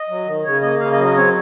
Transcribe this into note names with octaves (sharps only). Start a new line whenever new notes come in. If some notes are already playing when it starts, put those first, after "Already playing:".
Already playing: D#5
F#3
D#3
C#3 C#5
A#3 D#5
C#3 F5
D#5
F#3
D#5
C4 C#5